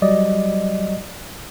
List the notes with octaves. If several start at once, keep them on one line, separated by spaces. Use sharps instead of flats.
F#3 G3 D5 D#5